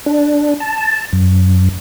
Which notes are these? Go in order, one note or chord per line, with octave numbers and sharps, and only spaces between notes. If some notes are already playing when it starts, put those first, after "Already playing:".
D4
A5
F#2